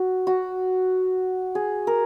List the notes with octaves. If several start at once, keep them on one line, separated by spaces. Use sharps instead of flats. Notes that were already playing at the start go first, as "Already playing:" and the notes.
Already playing: F#4
F#4
G#4
A#4